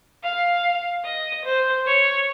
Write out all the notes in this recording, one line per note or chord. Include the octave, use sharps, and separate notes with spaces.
F5
D#5
C5
C#5